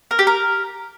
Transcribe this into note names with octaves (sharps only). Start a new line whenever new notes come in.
A#4
G4
A#4